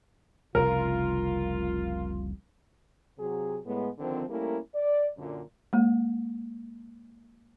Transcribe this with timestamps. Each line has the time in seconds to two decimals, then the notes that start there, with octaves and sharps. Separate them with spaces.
0.55 F1 C2 C#3 F4 A#4
3.19 C3 F#3 G#4
3.65 A2 G#3 B3
3.98 D3 D#3 F3 C4
4.30 G3 A3 A#3 C#4 E4 A#4
4.75 D5
5.17 F#2 A#2 D3
5.73 G#3 A#3